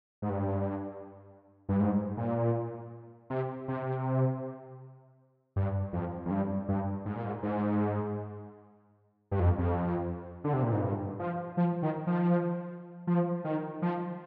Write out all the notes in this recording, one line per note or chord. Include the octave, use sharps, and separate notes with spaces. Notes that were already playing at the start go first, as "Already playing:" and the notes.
G#2
G2
G2
G#2
A#2
C3
C3
G2
F2
F2
G2
G2
G#2
A#2
G#2
G#2
G2
F2
F2
D3
C3
A#2
G#2
G2
F3
F3
D#3
F3
F3
D#3
F3